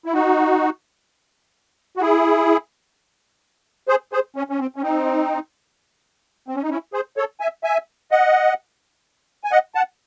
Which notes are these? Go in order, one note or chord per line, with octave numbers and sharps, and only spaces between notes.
E4
D#4 F#4
F#4
E4 G#4
G#4 C5
G#4 C5
C#4
C#4
C4
C#4
C4 D#4
C4
C#4
D#4
C#4 E4
G#4 C5
A4 C#5
E5 G#5
E5 G#5
D#5 F#5
G#5
D#5 F#5
F#5 A5